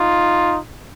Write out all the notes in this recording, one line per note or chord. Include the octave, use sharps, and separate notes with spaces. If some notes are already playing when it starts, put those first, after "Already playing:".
Already playing: D#4 F4